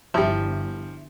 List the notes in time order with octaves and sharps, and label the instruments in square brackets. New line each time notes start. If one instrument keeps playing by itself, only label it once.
[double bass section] G1 [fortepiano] F3 G3 [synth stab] E4